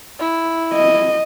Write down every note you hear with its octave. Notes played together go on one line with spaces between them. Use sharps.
E4
D#5